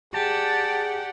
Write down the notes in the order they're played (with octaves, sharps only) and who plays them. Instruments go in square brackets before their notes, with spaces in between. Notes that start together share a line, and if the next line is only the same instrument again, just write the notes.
[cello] G4 [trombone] G#4 [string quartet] D5 F#5 G5 [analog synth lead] A5